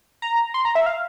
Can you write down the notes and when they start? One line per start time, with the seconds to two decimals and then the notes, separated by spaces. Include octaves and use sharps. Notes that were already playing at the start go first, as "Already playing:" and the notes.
0.22 A#5
0.54 C6
0.65 A#5
0.75 E5
0.86 F5